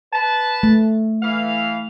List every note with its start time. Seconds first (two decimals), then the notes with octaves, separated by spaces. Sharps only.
0.13 B4 A5
0.63 A3
1.22 E3 F5